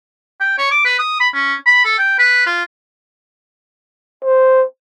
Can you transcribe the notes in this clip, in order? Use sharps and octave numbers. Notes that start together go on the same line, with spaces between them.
G5
C#5
D6
B4
D#6
B5
C#4
B5
A4
G5
B4
F4
C5